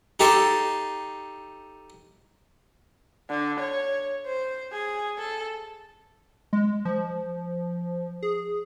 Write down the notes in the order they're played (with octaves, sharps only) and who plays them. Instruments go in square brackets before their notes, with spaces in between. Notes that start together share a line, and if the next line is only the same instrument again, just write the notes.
[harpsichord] D#4 G4 A4 C6
[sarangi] D3
C#5
C5
G#4
A4
[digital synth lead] G#3
F3
G#4